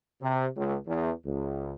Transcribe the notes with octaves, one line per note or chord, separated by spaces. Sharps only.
C3
C#2
E2
C#2